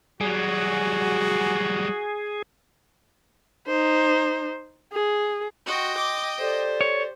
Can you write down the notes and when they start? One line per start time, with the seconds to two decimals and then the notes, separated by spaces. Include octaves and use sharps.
0.21 F#3 G3 F#4 G#4
3.67 D#4 C5
4.93 G#4
5.66 F#4 D#5 G5 C6
5.97 D6
6.38 G4 A4 C5 D5
6.81 C#5